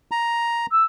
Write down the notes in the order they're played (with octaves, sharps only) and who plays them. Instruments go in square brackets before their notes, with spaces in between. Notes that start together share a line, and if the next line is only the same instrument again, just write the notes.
[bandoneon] A#5
[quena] E6